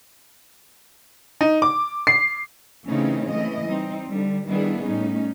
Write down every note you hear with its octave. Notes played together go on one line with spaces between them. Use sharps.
D#4
D6
C7
C#3 E3 A3 C4 C#4 D#4
E3 A3 D#5
G3 C4 D#4
D3 G3
D#3 G3 B3 D4 E4 G#4
A2 G3 C#4 D#4